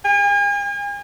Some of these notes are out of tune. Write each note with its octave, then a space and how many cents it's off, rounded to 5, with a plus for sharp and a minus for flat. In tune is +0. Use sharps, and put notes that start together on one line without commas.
G#5 -40